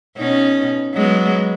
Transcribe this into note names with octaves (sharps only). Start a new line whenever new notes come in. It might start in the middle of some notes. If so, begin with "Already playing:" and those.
B2 C#4 D#4
F#3 G#3 B3